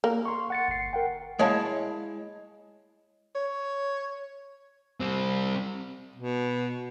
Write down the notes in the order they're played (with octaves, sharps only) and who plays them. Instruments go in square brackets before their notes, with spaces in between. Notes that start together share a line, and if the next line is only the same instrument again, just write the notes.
[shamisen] A#3
[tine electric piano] C6 C#6
F#5 A6 C#7
G1 C7
A#4 F#5 G5
[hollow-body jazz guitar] G#3 E4 C#5 F5 A5
[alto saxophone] C#5
[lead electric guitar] G3 C4
[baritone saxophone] B2